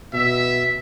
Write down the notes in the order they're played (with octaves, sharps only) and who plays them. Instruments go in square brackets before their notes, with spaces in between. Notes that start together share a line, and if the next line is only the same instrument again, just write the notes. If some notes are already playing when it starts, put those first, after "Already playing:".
[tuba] B2 [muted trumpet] E5